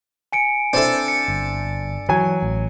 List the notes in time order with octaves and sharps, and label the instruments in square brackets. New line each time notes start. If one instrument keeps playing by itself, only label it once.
[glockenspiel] G#5 C#7 D7
[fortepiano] C4 E4 C5 [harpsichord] D4 A4
[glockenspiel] C#7
[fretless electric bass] G1
[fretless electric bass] E3 [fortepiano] F#3 G#5
[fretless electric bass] A1